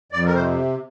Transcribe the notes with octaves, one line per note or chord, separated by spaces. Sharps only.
F2 D5
A#4
C3 C5